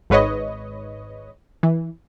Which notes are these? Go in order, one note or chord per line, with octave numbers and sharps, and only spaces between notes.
G#1 G#2 B4 C#5 D#5
E3